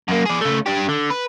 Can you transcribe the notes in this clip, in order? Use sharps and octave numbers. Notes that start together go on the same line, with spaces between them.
F#2 A#3
G#4 D5
C#3 A3
D4 G4
D3
B4